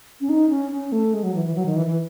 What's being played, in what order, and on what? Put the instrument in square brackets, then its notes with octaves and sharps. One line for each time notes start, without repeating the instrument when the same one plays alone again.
[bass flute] C#4
D#4
C#4
C#4
A3
G#3
F#3
E3
E3
F#3
D#3
E3
E3